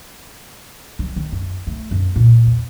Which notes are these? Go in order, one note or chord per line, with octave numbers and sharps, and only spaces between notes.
F#3
D#3
F#2
A3
F#2
A#2
E2